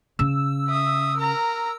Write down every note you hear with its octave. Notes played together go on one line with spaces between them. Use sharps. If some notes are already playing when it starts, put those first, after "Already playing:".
C#3 E6
E5 D#6
A#4 A#5